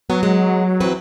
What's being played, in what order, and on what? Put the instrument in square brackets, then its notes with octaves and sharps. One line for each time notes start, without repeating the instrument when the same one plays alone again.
[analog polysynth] F#3 [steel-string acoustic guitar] B3
[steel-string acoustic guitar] G#3
E3 C4 B4